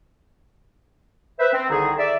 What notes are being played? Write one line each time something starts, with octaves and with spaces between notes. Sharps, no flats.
B4 C5 E5
C4
C2 D3 D#3 D#4 G#4
D5 E5